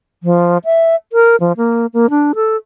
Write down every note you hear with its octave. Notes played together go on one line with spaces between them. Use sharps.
F3
E5
A#4
F3
A#3
A#3
D4
A4